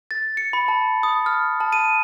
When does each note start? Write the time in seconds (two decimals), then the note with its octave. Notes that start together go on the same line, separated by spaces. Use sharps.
0.11 A6
0.37 C#7
0.53 B5
0.68 A5
1.03 D#6
1.26 F6
1.60 A5
1.73 D#7